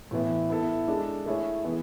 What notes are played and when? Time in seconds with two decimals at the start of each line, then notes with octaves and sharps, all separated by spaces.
0.11 A2 E3 B3 E4
0.50 B3 E4 A4
0.88 G#3 D4 A4
1.26 A3 E4 G#4 C#5
1.64 E3 B3 E4 B4